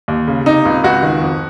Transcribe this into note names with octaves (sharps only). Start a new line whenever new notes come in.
D#2
C#3
C3 D#4
C#2
C#2 F#4
D#3
F2